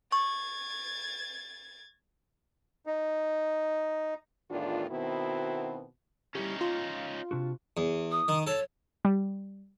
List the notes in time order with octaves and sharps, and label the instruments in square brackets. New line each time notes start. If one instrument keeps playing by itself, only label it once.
[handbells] C#6 [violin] G#6 A6
[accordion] D#4
[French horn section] E2 A2 D#3 D4 F4
B2 D#3 B3 C4 E4 F#4
[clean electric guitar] G3 E4 G4 [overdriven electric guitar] C#4 D#4
[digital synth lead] F4 [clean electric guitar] C6
[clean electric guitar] C3 D4 F#4
[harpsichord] E2
[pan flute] D#6
[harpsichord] D#3
[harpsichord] A4 [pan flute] C#5
[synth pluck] G3